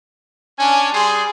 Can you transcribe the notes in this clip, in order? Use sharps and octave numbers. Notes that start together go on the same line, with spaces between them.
C#4 D4 G#5
G3 G#4 C6